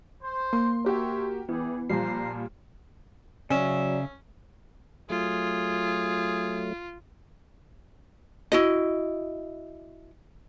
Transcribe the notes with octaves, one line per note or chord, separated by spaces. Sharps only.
C5
A#3 C6
F#4 G4 A#4 C5 C#5 E5
E3 G3 B3 G4 G#4
A#2 F3 G3 D4 C5 A#5 C7
C#3 F#3 C#4 D5 E5
F#3 A3 F4 G#4
E4 F#4 D#5